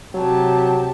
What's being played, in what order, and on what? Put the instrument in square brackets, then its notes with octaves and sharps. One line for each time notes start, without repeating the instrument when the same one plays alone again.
[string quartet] C3 G4 A5 [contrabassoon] F#3